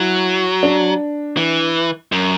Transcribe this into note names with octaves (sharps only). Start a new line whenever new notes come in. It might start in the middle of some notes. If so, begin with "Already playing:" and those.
Already playing: F#3 E4
D4
E3
F#2